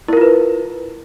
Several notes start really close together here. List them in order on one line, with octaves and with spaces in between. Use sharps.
E4 A#4 F4 B4